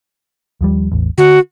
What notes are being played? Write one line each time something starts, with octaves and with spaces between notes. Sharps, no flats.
D#2 F3 G3
A1 E2
D3 F#4